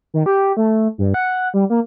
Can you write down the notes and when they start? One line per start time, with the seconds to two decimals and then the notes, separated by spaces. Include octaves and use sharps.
0.14 D#3
0.26 G4
0.57 A3
0.98 G2
1.14 F#5
1.54 G3
1.70 A#3